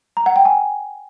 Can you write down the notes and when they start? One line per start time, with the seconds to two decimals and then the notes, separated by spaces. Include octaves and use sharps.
0.17 A#5
0.26 F#5
0.36 G5
0.45 G#5